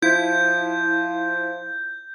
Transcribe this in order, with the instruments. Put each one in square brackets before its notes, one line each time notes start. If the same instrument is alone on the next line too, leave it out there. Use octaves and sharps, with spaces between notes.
[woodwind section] F3 [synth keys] E4 [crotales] G6